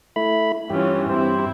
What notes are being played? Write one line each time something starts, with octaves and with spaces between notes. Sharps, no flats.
A3 E4 B5
G2 E3 C#4 F4 G4
G2 C4 E4 G4 C5